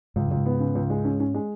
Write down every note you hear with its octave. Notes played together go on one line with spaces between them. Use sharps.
C#2 G#2
F#2
C#2
G#2
B3
C#3
C#2
G#3
C#4
C#4
G#3